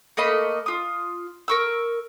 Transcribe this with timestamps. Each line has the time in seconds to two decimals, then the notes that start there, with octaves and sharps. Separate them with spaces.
0.17 A3 A#3 D#5 B5
0.66 F4 D#6
1.48 A#4 C#6 E6